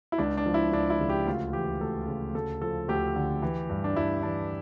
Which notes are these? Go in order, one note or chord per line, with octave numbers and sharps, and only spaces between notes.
E4
C#2 D4
D4
F3
E4
C#2 D4
E4
C#3
G4
D2 F4
E3 G4
D2 A4
C#3
D2 A4
F3 A4
D2 G4
D3
E3
G2
D4
G2 E4
E3 D4